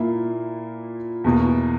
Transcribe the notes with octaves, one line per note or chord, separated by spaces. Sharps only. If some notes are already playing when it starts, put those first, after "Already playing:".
Already playing: A#2 A#3 E4
E2 B2 A#3